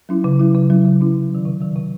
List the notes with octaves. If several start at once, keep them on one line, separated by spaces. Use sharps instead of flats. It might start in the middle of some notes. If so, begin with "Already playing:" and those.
F#3 C#4 E4
C#3
F#3 C#4 E4
C#3
F#3 C#4 E4
C#3
F#3 C#4 E4
C3
D#3 F#3
C3
D#3 F#3
C3